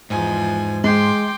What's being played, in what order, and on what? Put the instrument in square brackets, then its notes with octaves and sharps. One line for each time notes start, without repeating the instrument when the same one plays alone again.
[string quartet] E2 F3 G#5 [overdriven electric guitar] G#2
[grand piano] G#3 [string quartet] G5 C6 D6